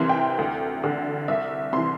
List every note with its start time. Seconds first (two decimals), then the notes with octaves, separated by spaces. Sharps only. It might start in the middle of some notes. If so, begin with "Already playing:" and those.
Already playing: C2 C3 E3 C6
0.09 G5
0.38 D2
0.84 D3
1.28 C2 E5
1.73 C3 E3 C6